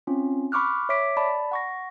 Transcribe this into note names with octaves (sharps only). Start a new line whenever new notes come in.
C4 C#4 F4
B5 C#6 D6 F6 F#6
C#5 E5 D6 B6 D7
D5 A5 B5
F#5 C#6 A#6